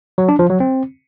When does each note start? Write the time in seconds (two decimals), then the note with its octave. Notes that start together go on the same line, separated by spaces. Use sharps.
0.18 F#3
0.29 D4
0.39 F3
0.50 F#3
0.60 C4